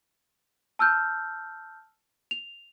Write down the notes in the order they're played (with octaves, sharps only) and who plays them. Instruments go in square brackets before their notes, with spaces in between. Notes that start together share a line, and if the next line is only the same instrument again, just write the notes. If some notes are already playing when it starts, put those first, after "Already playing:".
[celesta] A5 E6 F6 G6
F7